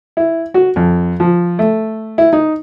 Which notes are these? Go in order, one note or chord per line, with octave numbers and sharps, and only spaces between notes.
E4
F#4
F2
F3
A3
E4
D#4